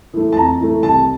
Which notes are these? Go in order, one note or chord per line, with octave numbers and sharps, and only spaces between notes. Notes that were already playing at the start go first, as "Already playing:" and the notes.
E3 A3
A5
F2 A#5
E3 A3
C2 A5